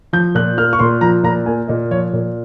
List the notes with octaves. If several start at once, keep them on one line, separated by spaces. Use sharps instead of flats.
F3 G6
A#2 F#6
A#3 F6
C#6
A#2 C6
F3 A#5
A#2 A#5
A#3 G#5
A#2 D#5
F3 C#5
A#2